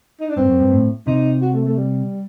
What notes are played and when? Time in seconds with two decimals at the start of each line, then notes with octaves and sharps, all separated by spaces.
0.20 D#4
0.29 D4
0.36 G2 C4
0.48 F#2
0.60 G2
0.71 A2
1.07 C3 D#4
1.41 F#4
1.53 A3
1.65 A3
1.77 G3